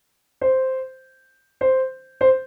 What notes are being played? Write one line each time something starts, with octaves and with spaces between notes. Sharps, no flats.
C5
C5
C5